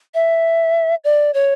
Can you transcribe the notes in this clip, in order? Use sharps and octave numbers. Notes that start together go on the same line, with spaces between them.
E5
D5
C#5